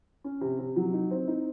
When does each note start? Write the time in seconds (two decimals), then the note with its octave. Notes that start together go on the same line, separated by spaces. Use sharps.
0.24 C#4
0.41 C3
0.59 C3
0.76 F#3
0.94 D#4
1.11 C4
1.28 D#4